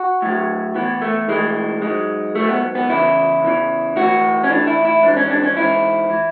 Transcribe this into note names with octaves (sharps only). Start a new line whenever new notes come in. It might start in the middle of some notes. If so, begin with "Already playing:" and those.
Already playing: F#4
A2 F#3
A2 E3 B3
A3
A2 E3 G#3
G#2 F#3 G#3
G#2 F#3 A3
B3
B3
E2 C#3 E3 E4
E2 C#3 E3
A2 E3 F#4
C#4
A2 E3 D4
E4
E4
G#2 E3 D4
C#4
D4
C#4
G#2 E3 E4
E3